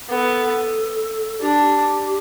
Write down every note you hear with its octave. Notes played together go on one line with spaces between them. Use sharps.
B3 A4
D4 G4